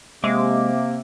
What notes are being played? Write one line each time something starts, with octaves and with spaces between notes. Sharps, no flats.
C3 G#3 A#3 E5 D6 E6